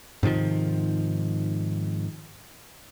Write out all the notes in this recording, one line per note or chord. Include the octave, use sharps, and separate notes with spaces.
G#2 C3 D#3 F3